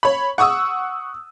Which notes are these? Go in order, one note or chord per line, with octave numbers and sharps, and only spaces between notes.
C#5 B5
F#5 C#6 D#6 E6